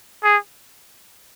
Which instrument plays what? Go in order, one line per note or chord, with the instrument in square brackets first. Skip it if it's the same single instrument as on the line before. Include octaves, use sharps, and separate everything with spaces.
[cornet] G#4